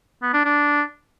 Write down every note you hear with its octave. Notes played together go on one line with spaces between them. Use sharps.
B3
D4
D4